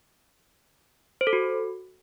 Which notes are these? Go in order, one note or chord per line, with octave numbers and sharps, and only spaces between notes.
C5
A4
F#4